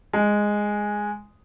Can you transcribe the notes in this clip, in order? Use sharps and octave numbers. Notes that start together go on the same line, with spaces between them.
G#3